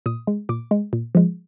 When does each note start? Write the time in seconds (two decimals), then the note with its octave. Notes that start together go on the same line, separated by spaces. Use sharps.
0.06 A#2 D#6
0.27 G#3
0.49 A#2 D6
0.71 G#3
0.93 A#2
1.15 F3 G#3